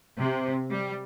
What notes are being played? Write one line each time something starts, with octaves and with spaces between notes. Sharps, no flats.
C3
G3